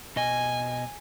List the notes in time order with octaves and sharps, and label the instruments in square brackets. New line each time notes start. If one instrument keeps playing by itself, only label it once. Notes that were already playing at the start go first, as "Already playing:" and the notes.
[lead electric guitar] B2 D#5 [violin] G#5